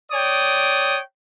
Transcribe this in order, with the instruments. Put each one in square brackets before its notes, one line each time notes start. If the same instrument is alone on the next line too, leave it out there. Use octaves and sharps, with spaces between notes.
[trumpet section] C#5 D5 G5 D#6